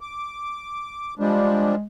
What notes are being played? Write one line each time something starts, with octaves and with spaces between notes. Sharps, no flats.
D6
F3 G3 G#3 D4